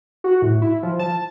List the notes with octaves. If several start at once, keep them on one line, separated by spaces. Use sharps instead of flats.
F#4
A2
E4
F3
A5